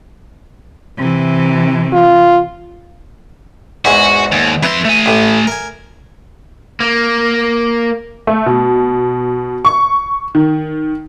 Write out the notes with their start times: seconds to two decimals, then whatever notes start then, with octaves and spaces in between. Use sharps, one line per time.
0.98 C3 E3
1.93 F4
3.85 E2 G#2 F#4 G#5
4.32 D#2
4.63 F2 E4 B4 C6
4.85 A3 G#5
5.06 A1 A2
5.47 A#4 G#5
6.80 A#3
8.27 A3
8.46 B2
9.65 C#6
10.35 D#3